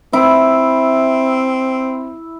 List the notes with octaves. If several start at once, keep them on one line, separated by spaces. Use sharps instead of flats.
C4 E4